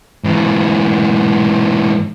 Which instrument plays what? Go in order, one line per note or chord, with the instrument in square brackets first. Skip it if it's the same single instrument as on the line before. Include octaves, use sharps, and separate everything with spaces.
[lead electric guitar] G#2 E3